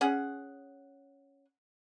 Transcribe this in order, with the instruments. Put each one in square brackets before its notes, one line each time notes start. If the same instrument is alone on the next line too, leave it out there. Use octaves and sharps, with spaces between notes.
[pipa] C#4 G#4 F#5